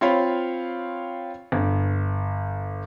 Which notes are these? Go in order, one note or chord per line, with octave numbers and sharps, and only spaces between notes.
C4 F4 C#5 F5 B5
G1